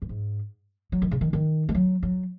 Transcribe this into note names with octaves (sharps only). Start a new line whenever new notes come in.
F#2
G#2
F#3
D#3
C#3
D#3
D#3
G#3
F#3
F#3